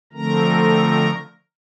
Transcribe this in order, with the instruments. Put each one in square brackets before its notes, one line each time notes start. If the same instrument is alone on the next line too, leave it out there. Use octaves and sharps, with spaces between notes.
[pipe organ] D3 F3 A3 C4 A#4 A#5